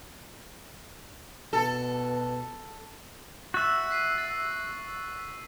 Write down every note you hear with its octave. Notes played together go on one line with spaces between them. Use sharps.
B2 A4
F#4 E5 E6 G6 A6
B6 C7 D#7
A6